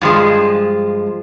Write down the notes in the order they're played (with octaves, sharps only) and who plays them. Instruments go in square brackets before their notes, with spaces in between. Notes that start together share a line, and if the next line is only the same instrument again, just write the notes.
[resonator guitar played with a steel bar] G2 F3 G#3